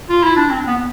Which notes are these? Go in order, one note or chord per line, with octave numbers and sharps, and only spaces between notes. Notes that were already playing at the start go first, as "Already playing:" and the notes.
F4
E4
D4
C4
B3